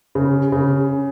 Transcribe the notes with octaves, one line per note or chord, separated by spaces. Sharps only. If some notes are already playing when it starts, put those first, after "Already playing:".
C#3
C#3